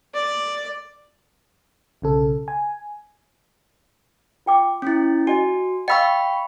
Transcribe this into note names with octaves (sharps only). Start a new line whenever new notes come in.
D5
B1 C#3 A4
G#5
F4 G5 D6
C#4 E4
F#4 D#5 G#5
D#5 F5 G5 B5 C#6 E6